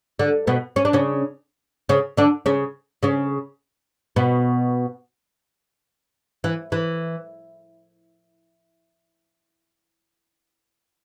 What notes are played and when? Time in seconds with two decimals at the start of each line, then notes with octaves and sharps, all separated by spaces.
0.19 D3
0.47 B2 B3
0.76 C#4
0.85 D4
0.93 C#3 C#4
1.89 C#3 C#4
2.17 D3 D4
2.46 C#3 C#4
3.03 C#3 C#4
4.16 B2 B3
6.44 E3
6.72 E3